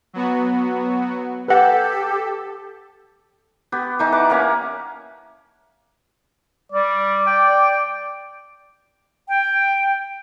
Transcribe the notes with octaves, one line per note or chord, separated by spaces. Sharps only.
F#3 B3 F#4
G4 A4 B4 F#5
B3 G4
E3 D#4 A5
B4 F#5 D6
A#3 C#4
G3 D5
G5
G5